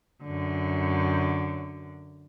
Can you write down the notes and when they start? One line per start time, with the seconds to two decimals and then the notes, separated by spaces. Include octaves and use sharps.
0.23 F#2 D3